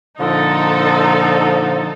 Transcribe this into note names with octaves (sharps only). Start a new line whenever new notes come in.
A#2 D3 F3 D#4 A4